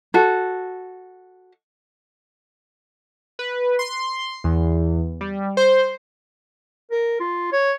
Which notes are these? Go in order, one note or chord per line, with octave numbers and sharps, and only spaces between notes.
F#4 A4
B4
C6
E2
G3
C5
A#4
F4
C#5